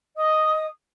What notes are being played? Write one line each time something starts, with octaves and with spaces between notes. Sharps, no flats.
D#5 D#6